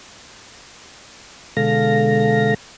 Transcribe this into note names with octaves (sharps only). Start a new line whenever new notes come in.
B2 D3 G#3 A4 F5 A#6